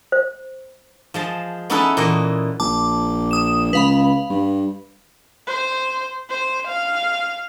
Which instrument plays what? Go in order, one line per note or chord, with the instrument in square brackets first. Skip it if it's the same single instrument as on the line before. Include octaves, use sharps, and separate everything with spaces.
[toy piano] C5
[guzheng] F3 G#3 A5
B3 C#4 D#4 E4 A4 B4
A#2 E3 D#5
[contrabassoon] A#1 [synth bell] A5 D6
[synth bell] D#6 E7
[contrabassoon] C#2 [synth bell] B4 F5 B5
[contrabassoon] G2
[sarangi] C5
C5
F5